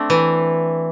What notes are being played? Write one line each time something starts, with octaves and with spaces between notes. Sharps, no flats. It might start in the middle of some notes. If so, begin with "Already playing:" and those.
Already playing: A3 C4 D4
E3